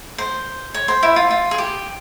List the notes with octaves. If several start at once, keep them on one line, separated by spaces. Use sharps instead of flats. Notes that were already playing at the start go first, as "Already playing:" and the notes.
C5
C#5
C5
E4
F4
F4
G#4
G4